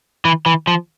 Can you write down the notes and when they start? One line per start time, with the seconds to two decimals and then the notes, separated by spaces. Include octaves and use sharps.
0.25 E3
0.46 E3
0.67 F3